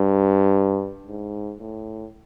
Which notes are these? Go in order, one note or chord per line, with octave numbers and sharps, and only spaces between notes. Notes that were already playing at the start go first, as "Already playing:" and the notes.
Already playing: G2
G#2
A2